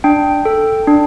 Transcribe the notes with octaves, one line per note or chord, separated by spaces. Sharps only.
D4 G5
A4
D4